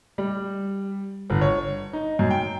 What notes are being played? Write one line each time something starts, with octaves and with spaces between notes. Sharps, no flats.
G3
G1
C#5
D#4
F#2
G5